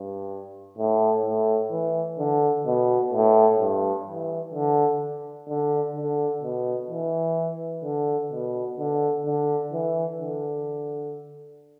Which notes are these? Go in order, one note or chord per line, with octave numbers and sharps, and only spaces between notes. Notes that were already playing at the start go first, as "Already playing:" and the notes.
Already playing: G2
A2
A2
E3
D3
B2
A2
G2
E3
D3
D3
D3
B2
E3
D3
B2
D3
D3
E3
D3